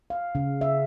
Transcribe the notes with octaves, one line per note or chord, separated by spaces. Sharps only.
F5
C#3
E5